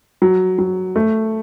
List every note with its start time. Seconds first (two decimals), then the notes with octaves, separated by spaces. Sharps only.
0.22 F#3
0.59 F#3
0.96 A3